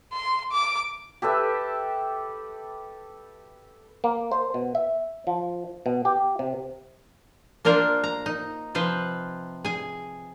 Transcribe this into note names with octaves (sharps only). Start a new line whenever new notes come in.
C6
D6
G4 A4 B4 E5
A#3
C5
B2
E5
F3
B2
G4
C3
A#3 D4 F4 A#4 C5
A#5
D#4
C3 F3 B4 C5
G#4 G#5